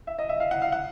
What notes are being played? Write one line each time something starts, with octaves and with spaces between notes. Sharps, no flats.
E5
D#5
E5
F5
F#5
F5
F#5